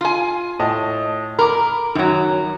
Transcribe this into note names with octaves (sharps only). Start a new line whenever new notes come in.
F4 G#5
A2 D#5 A5
A#4 B5 D6
F#2 D#3 F#3